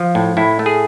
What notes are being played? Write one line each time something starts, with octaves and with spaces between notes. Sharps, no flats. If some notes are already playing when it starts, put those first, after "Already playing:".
Already playing: F3
A2
A2 E4
A3
G#4